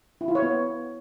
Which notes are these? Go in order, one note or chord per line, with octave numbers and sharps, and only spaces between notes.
E4
F4
C#5
B3